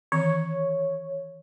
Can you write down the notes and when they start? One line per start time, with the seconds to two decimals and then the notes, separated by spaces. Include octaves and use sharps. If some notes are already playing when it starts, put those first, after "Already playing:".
0.12 D#3 E3 C4 C#5